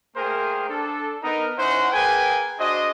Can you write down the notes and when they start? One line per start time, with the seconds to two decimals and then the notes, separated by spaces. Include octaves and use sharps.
0.16 A3 A#3 G#4 A#4 C5 G5
0.70 D4 A4
1.23 B3 D#4 A#4
1.59 C#4 D#4 E4 C5 F#5
1.93 A#3 G#4 B4 G5 G#5
2.59 D4 F#4 G#4 C5 D#5